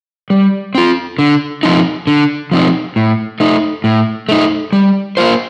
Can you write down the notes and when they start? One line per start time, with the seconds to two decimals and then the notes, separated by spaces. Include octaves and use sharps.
0.30 G3
0.75 C4 F4
1.19 D3
1.63 F3 C4 D#4
2.07 D3
2.52 F3 C4 D#4
2.96 A2
3.40 A3 D#4
3.84 A2
4.29 A3 D#4
4.73 G3
5.17 A#3 F4 C5